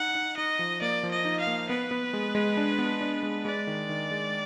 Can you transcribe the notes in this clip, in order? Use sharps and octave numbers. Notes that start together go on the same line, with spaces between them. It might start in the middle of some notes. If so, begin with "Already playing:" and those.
Already playing: D#4 F#5
D#4
D#4 D#5
F3
A#3 D5
F3
D#5
D#4
F5
A#3
B3 B4
B3
G#3
G#3
D4
B3
D4
G#3
G#3 D5
D#3
D#3
G#3